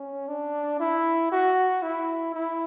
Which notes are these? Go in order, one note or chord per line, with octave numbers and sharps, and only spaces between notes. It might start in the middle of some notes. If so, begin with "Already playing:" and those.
Already playing: C#4
D4
E4
F#4
E4
E4